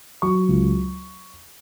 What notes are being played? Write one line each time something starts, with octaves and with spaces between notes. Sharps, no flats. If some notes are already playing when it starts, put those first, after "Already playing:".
F#3 C#6
C#2